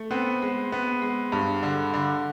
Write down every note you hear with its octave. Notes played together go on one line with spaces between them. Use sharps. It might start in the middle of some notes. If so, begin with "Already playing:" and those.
Already playing: A3
B3 C4
G#3
B3
G#3
G2
D3
D3